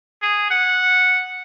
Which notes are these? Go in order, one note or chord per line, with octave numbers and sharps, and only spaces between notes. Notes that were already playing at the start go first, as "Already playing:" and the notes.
G#4
F#5